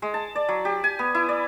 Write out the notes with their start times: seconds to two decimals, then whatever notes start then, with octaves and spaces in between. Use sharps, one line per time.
0.02 G#3
0.14 A5
0.35 D5
0.49 F#3
0.65 G4
0.84 G#5
0.99 B3
1.15 E4
1.29 D5